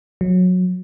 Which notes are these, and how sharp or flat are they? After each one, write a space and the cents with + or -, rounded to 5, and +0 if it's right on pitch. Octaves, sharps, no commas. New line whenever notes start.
F#3 -20